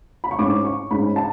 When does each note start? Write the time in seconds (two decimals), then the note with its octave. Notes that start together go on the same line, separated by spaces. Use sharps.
0.24 B5
0.31 C#6
0.39 G#2 G#3 C#4 D6
0.65 C#6
0.91 G#2 G#3 C#4 B5
1.16 A5